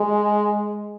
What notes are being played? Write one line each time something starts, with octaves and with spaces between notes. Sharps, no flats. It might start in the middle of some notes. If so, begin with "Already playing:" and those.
Already playing: G#3